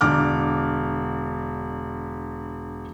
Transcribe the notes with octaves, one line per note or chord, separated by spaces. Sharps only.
E1 D3 D6 F6